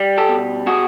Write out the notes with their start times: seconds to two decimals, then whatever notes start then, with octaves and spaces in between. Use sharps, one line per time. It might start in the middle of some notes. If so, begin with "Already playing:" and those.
Already playing: G3
0.18 G4 A4
0.29 B2
0.66 B2 F#4 G#4